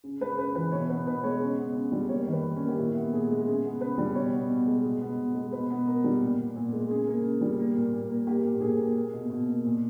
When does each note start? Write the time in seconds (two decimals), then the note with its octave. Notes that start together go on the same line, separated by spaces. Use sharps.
0.04 C#3
0.20 G#3 B4
0.38 C#3 B4
0.55 E3 B4
0.72 B2 C#5
0.89 B3 B4
1.07 B2 B4
1.23 G#3 C#5
1.41 C#3
1.58 B3
1.75 C#3
1.92 G3
2.09 A#3 C#5
2.27 D#3
2.32 B4
2.44 D#3
2.56 C#4
2.61 A#3
2.68 G4
2.78 A#2 E4
2.95 B3
3.12 A#2 G#4
3.30 G#3
3.47 C#3 G#4
3.64 B3
3.80 C#3 B4
3.98 G3
4.15 B2 C#5
4.33 B3
4.50 B2
4.67 G#3
4.84 B2
5.01 B3
5.18 B2
5.35 G#3
5.52 B2 B4
5.70 B3
5.87 B2 A#4
6.04 G3
6.22 A#2
6.39 B3
6.56 A#2
6.72 G#3
6.90 C#3 G#4
7.07 A#3
7.24 C#3
7.41 G3
7.59 A#3
7.76 A#2
7.92 A#2
8.09 A#3
8.27 A#3 G4
8.45 A#2
8.61 A#2 G#4
8.79 A#3
8.95 A#3
9.13 B2
9.30 B2
9.47 A#3
9.65 A#2